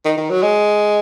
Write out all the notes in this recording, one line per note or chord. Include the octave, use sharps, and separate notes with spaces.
D#3
D#3
F#3
G#3